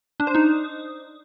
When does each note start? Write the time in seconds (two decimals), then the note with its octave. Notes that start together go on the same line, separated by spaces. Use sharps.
0.20 D4
0.27 C5
0.35 D#4